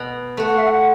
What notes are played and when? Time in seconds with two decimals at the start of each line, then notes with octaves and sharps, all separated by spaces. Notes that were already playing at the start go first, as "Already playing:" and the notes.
Already playing: B2
0.37 A3 F#4
0.48 F#5
0.58 E5
0.67 F#5